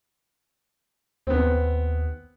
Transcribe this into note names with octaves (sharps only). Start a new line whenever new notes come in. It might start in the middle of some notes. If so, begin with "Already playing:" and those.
D#2 B3 C4